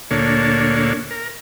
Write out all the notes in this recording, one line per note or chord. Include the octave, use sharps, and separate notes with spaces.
D2 A#2 A#3 D4 A4 C#5
A#4